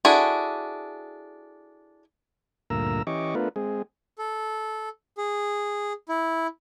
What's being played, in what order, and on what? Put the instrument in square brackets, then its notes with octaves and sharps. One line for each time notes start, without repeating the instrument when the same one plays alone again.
[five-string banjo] D4 E4 F#4 G#4 A4
[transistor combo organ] D2 G2 A#2 A#4 A#5 E6
E3 C#4 G4 D#5 C#6 D6
A3 B3 D4 F4 A#4 B4
G#3 C4 G#4
[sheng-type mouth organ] A4
G#4
E4